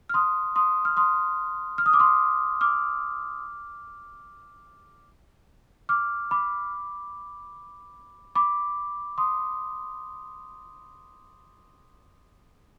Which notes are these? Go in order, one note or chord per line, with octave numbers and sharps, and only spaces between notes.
F6
C6 D#6
C6 D#6
F6
C6 D#6
F6
D#6
D6
C6 D#6
D6 F6
D6 F6
B5 D6
B5 D6
C6 D#6